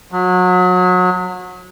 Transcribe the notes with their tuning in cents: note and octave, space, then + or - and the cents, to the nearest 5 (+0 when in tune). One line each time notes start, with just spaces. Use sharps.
F#3 -30